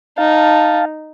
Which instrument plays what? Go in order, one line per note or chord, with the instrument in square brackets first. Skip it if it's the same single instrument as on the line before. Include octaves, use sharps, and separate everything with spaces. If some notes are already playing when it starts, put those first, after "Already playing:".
[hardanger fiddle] D#4 [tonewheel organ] F5 A5